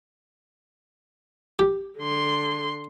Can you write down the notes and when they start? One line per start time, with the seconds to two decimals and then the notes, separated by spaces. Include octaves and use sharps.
1.59 G4
1.99 D3 C6